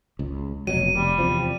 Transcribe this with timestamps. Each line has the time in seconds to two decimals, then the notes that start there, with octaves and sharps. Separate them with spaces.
0.19 C#2
0.67 F1 B2 F#3 D#7
0.96 F1 G3
1.19 E2 C3 F3